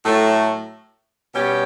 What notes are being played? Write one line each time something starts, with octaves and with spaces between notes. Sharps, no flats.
A2 F#3 A3
B2 G3 C#4 G4